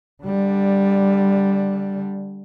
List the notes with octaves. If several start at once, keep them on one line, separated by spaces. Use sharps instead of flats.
D3 G3